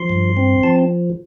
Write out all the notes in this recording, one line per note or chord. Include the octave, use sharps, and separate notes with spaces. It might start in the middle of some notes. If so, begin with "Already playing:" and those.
Already playing: F3 C6
G2
C4
F3 A5